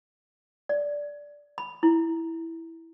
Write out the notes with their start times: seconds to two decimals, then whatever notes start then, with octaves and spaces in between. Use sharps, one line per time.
0.69 D5
1.58 B5
1.83 E4